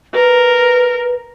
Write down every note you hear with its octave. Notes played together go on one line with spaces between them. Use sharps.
A#4 B4